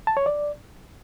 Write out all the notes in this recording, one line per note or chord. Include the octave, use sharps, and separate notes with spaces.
A5
C#5
D5